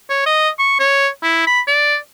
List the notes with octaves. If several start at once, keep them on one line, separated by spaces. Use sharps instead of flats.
C#5
D#5
C#6
C#5
E4
B5
D5